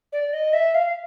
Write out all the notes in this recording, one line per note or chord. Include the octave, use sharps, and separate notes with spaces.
D5
D#5
E5
F5